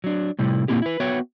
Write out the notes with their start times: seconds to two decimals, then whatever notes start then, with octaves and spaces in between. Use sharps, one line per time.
0.04 F#3 D4
0.39 A2 C3 G3 E4
0.68 A#2 E3 A#3 C4 E4 G4
0.82 E4 B4
1.00 B3 F#4 B4 C#5 E5 G5